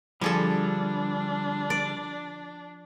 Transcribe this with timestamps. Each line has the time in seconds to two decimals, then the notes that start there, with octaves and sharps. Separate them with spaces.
0.21 D3 F3 G3 D4 G#4 A4
1.70 D5